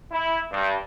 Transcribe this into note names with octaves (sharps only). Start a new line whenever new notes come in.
E4
G2